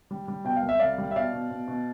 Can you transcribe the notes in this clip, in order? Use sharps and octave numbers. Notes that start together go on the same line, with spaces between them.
G3
G3
B2 G5
F5
C2
E5
C2 D5 F5
G3
E5
B2 D5 F5
B2
B2
B2